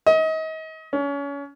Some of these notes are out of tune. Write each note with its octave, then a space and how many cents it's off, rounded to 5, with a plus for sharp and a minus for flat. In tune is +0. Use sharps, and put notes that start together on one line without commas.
D#5 +35
C#4 +30